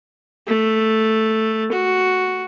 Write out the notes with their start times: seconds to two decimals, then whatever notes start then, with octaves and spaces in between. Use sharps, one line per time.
0.47 A3
1.71 F#4